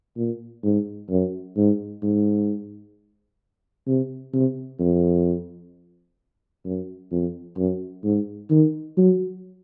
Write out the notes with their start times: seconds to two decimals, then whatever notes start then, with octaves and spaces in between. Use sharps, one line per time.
0.17 A#2
0.64 G#2
1.10 F#2
1.57 G#2
2.03 G#2
3.87 C3
4.34 C3
4.80 F2
6.65 F#2
7.11 F2
7.57 F#2
8.04 G#2
8.50 D#3
8.97 F#3